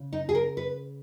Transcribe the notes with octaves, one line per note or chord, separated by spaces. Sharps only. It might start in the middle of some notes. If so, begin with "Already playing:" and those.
Already playing: C#3
D#4
G#4
A#4
B4